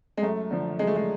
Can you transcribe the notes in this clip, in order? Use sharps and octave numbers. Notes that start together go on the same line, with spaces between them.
G#3
F#2 A3
D3 F3
F#2 G#3
A3
G#3